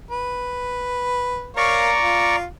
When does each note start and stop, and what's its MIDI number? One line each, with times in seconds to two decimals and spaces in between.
0.11 1.49 71
1.57 1.91 70
1.57 1.91 73
1.57 2.36 74
1.57 1.91 77
1.57 2.36 82
1.57 2.36 85
2.00 2.44 65